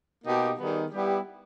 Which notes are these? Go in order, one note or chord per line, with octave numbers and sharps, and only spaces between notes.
B2 A#3 D#4 G4
D#3 G3 B3 D#4 G#4
G3 B3 E4 G4